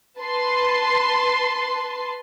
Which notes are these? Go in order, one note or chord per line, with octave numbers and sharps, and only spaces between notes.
B4 A5 C6